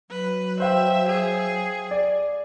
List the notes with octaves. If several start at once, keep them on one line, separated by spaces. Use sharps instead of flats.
F#3 B4
C5 E5 F5 G5
G#4
D5